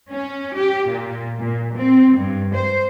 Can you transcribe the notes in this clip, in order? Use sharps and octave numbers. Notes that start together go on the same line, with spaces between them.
C#4
G4
A#2
A#2
C4
G2
C5